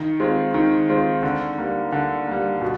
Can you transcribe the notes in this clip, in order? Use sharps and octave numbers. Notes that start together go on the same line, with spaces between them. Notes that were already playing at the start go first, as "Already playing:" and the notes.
Already playing: D#3
G#3 C4 F4
D#3
G#3 C4 F4
D3
G3 A#3
D3
G3 A#3
B2